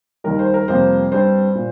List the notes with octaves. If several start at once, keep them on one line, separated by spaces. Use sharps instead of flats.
D#2 D#3 G3 A#4
C5
A#4
F2 C3 G3 A#3 C5
G2 G3 C4 C5
A#2